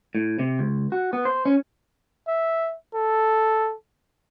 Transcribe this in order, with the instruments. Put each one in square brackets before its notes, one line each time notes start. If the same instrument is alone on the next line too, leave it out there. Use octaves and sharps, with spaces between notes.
[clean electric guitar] A2
C3
C#2
F#4
B3
C5
C#4
[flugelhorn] E5
A4